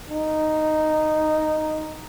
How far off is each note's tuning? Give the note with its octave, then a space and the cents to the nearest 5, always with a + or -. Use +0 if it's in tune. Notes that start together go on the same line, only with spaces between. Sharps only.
D#4 -5